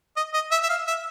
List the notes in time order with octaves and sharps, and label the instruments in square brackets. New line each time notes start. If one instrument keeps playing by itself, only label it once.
[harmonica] D#5
D#5
E5
E5
F5
E5